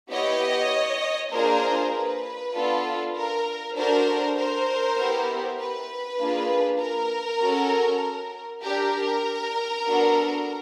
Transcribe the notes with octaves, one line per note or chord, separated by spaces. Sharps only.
B3 E4 G4 C#5 D#5
A#3 D4 F4 G#4 A#4 C5
B4
B3 D4 F4 A4
A#4
D4 F#4 A4 A#4 C5
A#4 C5
B3 E4 G4
B4
A#3 D4 F4 G#4
A#4
C#4 F#4 A4
D4 G4 A#4
B3 D4 F#4 A4